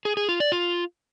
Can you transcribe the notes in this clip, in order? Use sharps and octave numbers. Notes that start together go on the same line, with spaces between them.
G#4
G#4
F4
D5
F4